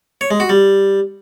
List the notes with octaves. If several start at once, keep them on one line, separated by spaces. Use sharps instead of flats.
C#5
G#3
F#4
G3